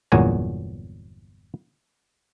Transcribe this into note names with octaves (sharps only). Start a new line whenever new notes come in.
G1 E2 A#2 F#3 F#4 G#5